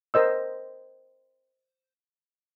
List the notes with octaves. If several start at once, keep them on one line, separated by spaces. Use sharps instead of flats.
A#4 C5 D#5 E6